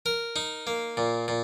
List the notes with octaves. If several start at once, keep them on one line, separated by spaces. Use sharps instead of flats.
A#4
D#4
A#3
A#2
A#2